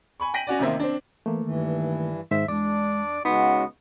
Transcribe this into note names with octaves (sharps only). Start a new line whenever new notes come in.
G#5 B5 C#6
G5 A#6 B6 D#7 F#7
C#4 F#4 D5
A1 C3 D#3 A#3 C5 E5
C4 D4
E3 A3 A#3
G2 D#3 E3
G#2 D#3 C5 E5
E2 G#3 D4 D5
C#3 G#3 B3 D#4 F#4 F#5 C6